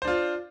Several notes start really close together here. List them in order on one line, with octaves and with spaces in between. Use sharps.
C5 D4 F4